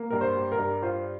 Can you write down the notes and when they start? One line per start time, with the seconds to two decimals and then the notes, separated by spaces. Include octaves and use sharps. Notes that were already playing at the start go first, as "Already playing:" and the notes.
Already playing: A#3
0.10 G2 A#4
0.21 C5
0.35 G3
0.52 A#4
0.58 G2
0.82 F4 C5